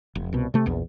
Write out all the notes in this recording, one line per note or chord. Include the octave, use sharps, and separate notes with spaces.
F1
C2 B2
C3 A3
A#1 E2